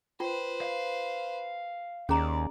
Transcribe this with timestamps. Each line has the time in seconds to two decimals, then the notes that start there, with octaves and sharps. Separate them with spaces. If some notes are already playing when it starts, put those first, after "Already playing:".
0.20 F4 B4 C5 G5
0.61 F5
2.09 D#2 C#4 G#4 D5 A#5